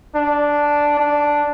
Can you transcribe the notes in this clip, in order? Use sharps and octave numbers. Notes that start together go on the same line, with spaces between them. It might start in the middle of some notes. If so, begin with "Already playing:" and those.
D4
D4